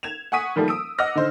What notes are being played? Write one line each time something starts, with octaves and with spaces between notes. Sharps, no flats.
G#6 E7 F7
F#5 G#5 C#6 D#6 B6 D#7
D#3 F3 G3 A3 A#3
D#6 E6 D7
D#5 F#5 D6 E6 F6 A#6
D3 D#4 C5